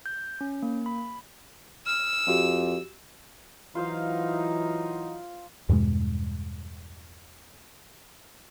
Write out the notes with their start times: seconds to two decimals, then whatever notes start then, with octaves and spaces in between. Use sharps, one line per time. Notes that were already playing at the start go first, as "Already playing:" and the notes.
0.06 G6
0.41 C#4
0.62 A#3
0.86 B5
1.86 E6 F6
2.27 F2 F#4 G4
3.75 E3 F#3 D#4 F4 C5 F5
5.69 E2 G2 B2 G#3